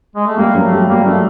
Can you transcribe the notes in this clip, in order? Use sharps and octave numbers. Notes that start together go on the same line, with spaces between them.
G#3
A3
G3 A#3
F#3
A3
G3
G3 A#3
F#3 A3